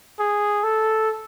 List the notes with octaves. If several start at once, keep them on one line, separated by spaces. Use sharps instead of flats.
G#4
A4